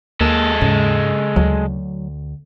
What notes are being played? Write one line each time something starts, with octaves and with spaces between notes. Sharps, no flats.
D#2 G#3 A#3 A4
G#2 C#3
D2 F#3